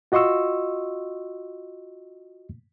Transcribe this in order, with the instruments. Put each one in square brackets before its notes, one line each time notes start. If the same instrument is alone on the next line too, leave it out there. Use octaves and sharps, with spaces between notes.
[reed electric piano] F4 F#4 D#5 C6 C#6 E6